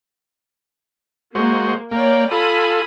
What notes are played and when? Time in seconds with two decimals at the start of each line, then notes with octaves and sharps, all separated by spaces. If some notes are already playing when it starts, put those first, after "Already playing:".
1.35 G#3 A#3 F#4 C5
1.91 A#3 C#5 D5 G5
2.31 F4 A4 G#5 B5 D#6